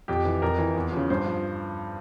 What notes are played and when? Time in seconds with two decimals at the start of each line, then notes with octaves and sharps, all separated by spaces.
0.08 F2 G4
0.25 E3
0.42 F2 A#4
0.58 E3
0.76 E2
0.92 C#3 F3
1.10 G2 C5
1.26 F3